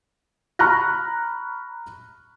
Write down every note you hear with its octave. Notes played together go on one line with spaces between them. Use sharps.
A#5 B5 C#6 F6 F#6 A#6